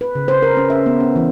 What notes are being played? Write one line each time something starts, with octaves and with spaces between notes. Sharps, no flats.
B4
C#3
C5
A#4
C#4
E5
B3
C#4
E3